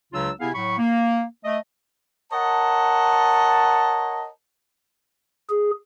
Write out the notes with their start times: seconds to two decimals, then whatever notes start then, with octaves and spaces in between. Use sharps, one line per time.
0.13 C#2 C#3 F#3 D4 F4 E6
0.40 C3 B3 E4 G#4 F5 G#5
0.55 A2 F#3 B5 C#6
0.79 A#3
1.45 A3 D#5
2.32 A#4 C#5 D#5 F#5 A5
5.50 G#4